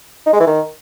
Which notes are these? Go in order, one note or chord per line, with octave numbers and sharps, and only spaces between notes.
D#4
G#3
E3
D#3